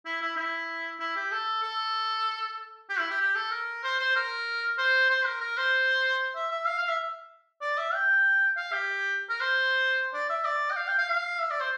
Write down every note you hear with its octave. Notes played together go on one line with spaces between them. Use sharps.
E4
E4
E4
E4
G4
A4
A4
G4
E4
G4
G4
A4
A#4
C5
C5
A#4
C5
C5
A#4
A#4
C5
E5
E5
F5
F5
E5
D5
E5
G5
F5
G4
A#4
C5
D5
E5
D5
G5
F5
G5
F5
F5
E5
D5
C5